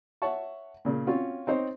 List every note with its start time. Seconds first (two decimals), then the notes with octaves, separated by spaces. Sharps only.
0.22 C#5 E5 F#5 A5 C#6
0.85 A#2 C#3
1.07 C4 C#4 F4 F#4
1.47 C4 D#4 C5 C#5